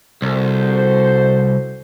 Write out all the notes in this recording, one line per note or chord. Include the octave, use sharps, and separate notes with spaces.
C2 F#4 A4 C5